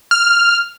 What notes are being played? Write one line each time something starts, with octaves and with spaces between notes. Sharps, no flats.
F6